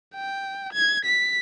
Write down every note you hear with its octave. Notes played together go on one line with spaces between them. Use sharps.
G5
G#6
B6